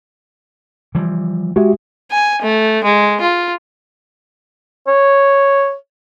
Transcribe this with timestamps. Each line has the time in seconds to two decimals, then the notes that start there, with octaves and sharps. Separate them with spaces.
0.95 E3 F3 G3
1.56 G#3 F#4 G4 E5
2.11 G#5
2.42 A3
2.84 G#3
3.21 F4
4.88 C#5